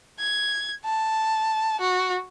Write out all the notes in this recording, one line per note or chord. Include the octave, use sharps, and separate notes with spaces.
G#6
A5
F#4